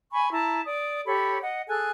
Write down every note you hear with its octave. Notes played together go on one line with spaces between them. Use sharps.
G#5 B5 C#6
E4 A5 A#5
D5 D#6
G4 A4 C#5 B5
D#5 F#5
G#4 A4 G#5 F#6